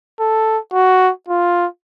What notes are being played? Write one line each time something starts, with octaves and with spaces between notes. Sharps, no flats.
A4
F#4
F4